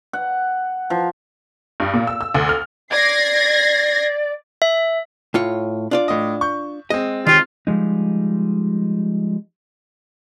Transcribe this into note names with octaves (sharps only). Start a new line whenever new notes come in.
F#5
F3
G2
A#2
E6
E6
D2
F6
D5 G#6 A#6 C7
E5
A2 F4 C#5
D4 F4 D5
A2 D#5
C#6 G6
G#3 C4 D#5
D#3 F4 G4 C#5
F3 G3 G#3 D#4